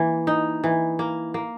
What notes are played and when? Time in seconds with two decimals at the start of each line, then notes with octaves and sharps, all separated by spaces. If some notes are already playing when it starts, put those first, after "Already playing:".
Already playing: E3 A#3
0.27 D#4
0.64 E3
0.99 A#3
1.34 A#3